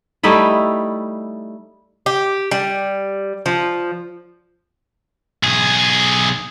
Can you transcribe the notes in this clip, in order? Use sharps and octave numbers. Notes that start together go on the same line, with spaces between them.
G3 A3 D#4 E4
G4
G3
F3
B1 G#4